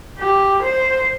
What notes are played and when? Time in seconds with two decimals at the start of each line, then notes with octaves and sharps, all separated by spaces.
0.19 G4
0.63 C5